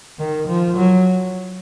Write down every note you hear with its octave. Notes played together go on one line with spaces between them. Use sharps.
D#3
F3
F#3